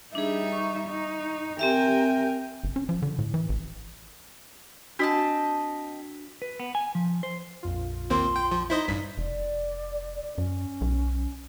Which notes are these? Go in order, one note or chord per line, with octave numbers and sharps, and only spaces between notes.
G3 D4 D#4 G#4 E5
C#6
D#4
C4 G4 A#4 E5 G5 G#5
G1
C#4
F3
D3
A2
E3
A1
C4 D4 F#4 D#5 A5 B6
B4
B3
G#5
F3
C5
A#1 F2 F4
D#2 A#3 C4 C6
G5
F3
D#4 E4 C5 D#5 B6
A1 G2 B6
F1 D5
F#2 C#4
B1